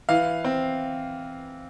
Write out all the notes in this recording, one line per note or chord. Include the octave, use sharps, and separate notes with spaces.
E3 F5
C4